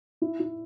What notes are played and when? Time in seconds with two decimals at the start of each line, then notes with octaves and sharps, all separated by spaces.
0.22 E4
0.40 E4